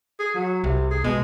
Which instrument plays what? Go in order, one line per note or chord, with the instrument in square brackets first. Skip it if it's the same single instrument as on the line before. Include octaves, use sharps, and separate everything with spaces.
[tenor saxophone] G#4
F#3
[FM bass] C2 [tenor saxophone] C3
[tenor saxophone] G#4
[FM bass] B2 [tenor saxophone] G#3